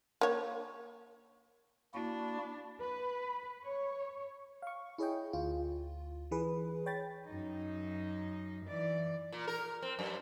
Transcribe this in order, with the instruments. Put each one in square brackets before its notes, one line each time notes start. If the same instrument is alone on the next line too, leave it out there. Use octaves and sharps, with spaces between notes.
[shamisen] A#3 C#5
[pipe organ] A#3 E4 F#4 [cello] D4
[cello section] B4
C#5
[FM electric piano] F5 C#6
E4 G#4 C#5 D#5 G5
D2 F4
E3 G#4 B4
C#5 G5 B5 A6
[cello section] F#2 D#4
E3 D5
[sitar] A#2
A#4
C4
F#2